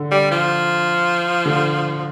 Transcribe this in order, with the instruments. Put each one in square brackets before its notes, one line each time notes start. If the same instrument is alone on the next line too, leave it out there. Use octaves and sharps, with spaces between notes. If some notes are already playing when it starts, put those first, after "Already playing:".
Already playing: [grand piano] D3
[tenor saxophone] G3
F3
[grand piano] D3